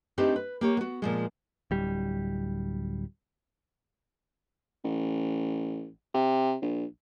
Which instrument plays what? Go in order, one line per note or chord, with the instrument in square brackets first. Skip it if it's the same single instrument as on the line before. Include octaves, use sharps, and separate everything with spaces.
[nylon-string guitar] A3 C4 D4 D#4 G4 B4
B4
A#3 G4 C#5
B3 F#4
A#2 F3 G#3
[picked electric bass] D1 G3
[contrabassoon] A1
C3
A#1